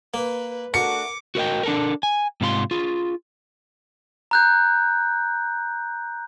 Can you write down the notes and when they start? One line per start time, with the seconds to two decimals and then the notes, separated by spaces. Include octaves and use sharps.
0.14 A#3 B4
0.74 A3 D4 F#4 A#4 D6 C#7
1.35 F#4 A#4 D#5 G5
1.63 D4 A4 A#4
2.03 G#5
2.41 G#2 C3 F4 B5 C6
2.71 F4 G#4
4.31 A#5 F#6 G6